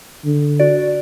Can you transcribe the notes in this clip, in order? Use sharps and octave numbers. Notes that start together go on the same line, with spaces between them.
D3
F#4 D5